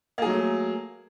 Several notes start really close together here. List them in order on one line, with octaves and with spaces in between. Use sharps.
A#3 G#4 F#3 A3